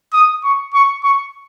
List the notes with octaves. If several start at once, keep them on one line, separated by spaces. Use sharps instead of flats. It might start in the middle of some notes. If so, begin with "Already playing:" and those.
D#6
C#6
C#6
C#6